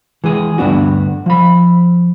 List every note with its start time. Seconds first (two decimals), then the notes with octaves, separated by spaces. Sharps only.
0.24 E3 G#3 G#4
0.58 D2 G2 B3 D4 F#4
1.26 F3 B5